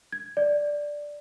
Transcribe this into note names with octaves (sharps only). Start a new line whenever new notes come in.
G#6
D5